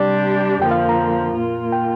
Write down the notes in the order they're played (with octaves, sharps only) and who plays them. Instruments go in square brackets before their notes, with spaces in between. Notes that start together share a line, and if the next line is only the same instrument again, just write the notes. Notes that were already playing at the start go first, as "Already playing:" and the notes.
Already playing: [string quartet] C3 G3 D4 G4 [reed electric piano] D5
[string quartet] F2 D3 F3 A#3 [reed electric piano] G5
[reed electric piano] F5
A#5
[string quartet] A#2 A#3 F4
[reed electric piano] G5